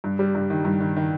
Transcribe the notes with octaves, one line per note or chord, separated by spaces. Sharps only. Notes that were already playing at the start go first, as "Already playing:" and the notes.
G2
G3
G2
D#3
G2
D#3
D#3